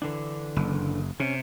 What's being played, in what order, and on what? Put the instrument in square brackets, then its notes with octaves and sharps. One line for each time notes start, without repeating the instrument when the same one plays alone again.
[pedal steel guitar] D3 E3 D4
[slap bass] F#1
[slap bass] C3 [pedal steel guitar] C#4